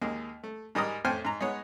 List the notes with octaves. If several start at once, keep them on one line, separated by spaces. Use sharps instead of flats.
D#2 G#3 A#3
A3
G#2 G3 G#3 A#4 D#5 D#6
F2 A2 C5 G5 G#5 F6
G#2 A#5
G#3 B3 D#4 C#5 F#5